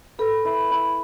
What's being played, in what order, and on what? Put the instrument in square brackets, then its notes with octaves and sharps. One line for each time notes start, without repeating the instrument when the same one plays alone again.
[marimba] A4 [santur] B4
[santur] E4
E4